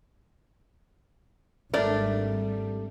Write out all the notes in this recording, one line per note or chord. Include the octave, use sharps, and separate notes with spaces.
G#1 G3 A3 D4 A#4 D5